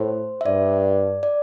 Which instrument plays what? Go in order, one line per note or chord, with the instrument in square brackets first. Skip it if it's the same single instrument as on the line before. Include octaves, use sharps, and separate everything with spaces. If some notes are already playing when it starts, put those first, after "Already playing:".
Already playing: [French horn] A2 [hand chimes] C5
[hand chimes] E5
[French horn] G2 [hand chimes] D5
[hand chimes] D5